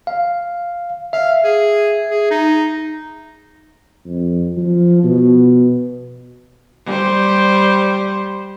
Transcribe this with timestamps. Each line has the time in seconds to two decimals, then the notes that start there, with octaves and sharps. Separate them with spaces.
0.07 F5
1.13 E5 F5
1.44 G#4
2.10 G#4
2.31 D#4
4.06 F2
4.57 F3
5.03 B2
6.86 G3 C5